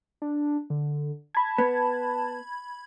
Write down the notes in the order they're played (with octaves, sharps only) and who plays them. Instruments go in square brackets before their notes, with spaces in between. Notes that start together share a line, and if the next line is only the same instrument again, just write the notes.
[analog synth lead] D4
D3
[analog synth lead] A5 [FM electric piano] B5 G#6
[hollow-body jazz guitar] B3